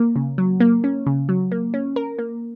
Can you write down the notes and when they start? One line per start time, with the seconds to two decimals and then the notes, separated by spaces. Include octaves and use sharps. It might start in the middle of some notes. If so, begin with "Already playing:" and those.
Already playing: A#3
0.16 C#3
0.38 F#3
0.60 A#3
0.84 C#4
1.07 C#3
1.29 F#3
1.52 A#3
1.74 C#4
1.96 A#4
2.19 A#3